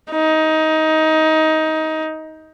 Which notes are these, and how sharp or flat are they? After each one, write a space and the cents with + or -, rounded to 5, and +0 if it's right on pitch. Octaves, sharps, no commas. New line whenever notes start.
D#4 +20